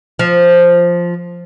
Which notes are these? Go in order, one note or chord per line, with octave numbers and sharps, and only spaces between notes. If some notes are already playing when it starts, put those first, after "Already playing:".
F3